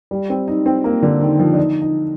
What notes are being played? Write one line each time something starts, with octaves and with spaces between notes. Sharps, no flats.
G3
C4
D#4
C4
A#3
D3
D#3
F3
D4
D#4
D#4